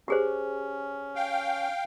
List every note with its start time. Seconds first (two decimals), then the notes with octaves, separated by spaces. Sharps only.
0.08 C#4 G4 G#4 C5
1.16 F5 G5